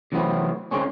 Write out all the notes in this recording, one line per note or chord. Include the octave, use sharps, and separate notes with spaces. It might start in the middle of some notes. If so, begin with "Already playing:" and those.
C3 E3 F#3 A3 B3 C4
D3 G#3 C4 C#4